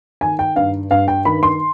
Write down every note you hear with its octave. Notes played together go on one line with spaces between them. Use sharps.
D#3 G#5
G5
G2 F5
G2 F5
G5
D#3 B5
C6